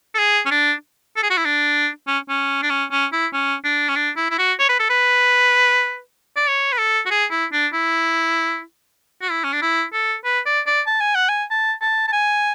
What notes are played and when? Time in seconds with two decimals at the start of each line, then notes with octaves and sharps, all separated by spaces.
0.14 A4
0.18 G#4
0.46 C#4
0.51 D4
1.17 A4
1.23 G#4
1.30 F#4
1.37 E4
1.45 D4
2.07 C#4
2.29 C#4
2.62 D4
2.70 C#4
2.91 C#4
3.12 E4
3.33 C#4
3.64 D4
3.89 C#4
3.96 D4
4.17 E4
4.30 E4
4.38 F#4
4.59 C#5
4.69 B4
4.79 A4
4.90 B4
6.37 D5
6.47 C#5
6.72 B4
6.78 A4
7.06 F#4
7.11 G#4
7.31 E4
7.53 D4
7.73 E4
9.22 F#4
9.31 E4
9.44 C#4
9.53 D4
9.62 E4
9.93 A4
10.25 B4
10.46 D5
10.67 D5
10.87 A5
11.01 G#5
11.15 F#5
11.29 G#5
11.51 A5
11.81 A5
12.08 A5
12.12 G#5